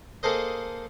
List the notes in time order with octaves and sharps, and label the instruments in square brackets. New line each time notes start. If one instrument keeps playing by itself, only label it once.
[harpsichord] A#3 G#4 A4 C5 D#5